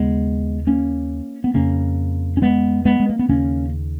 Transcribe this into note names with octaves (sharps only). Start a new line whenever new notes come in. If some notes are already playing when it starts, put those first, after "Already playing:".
Already playing: D#2 C#3 G#3 B3
A#3 C#4
B3
F2 C#3 A#3 C#4
C#4
G#3 B3
G#3 B3
G#3
A#3
B3
D#2 C#3 A#3 C#4